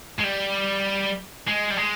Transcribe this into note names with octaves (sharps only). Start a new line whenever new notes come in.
G#3
G3
G#3
G3
G#3